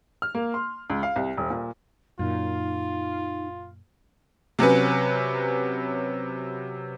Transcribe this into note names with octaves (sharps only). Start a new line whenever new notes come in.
F6
A#3
C6
C#2
F5
C2
D#1
A#2
F#2 A#2 D#4 F4
C3 F#3 C#4 B4